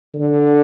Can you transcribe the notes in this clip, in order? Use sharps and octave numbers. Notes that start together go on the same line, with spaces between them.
D3